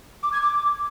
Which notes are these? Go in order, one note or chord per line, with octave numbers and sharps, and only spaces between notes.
D6
G#6
D6